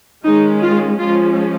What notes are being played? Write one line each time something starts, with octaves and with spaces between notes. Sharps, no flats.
D#3 G#3 C#4 D#4
F4
F3 G#3 C#4 F4